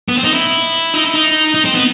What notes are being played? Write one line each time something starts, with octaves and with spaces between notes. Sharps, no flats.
B3
C4
D#4
E4
D#4
E4
D#4
D#4
C4
B3